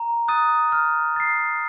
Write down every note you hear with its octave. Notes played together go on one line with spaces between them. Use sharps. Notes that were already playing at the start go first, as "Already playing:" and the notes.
Already playing: A#5
D#6 F#6 A6 D#7
F6
A6 C7